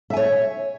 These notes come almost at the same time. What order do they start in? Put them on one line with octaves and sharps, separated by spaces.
E5 G#5 C#5